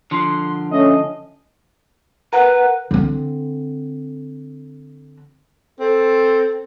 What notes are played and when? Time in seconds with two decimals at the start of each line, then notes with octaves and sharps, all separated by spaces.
0.11 D3 F3 C6
0.71 A3 C#4 D#5
2.33 A#4 B4 F#5
2.91 D3 C4
5.80 C4 A4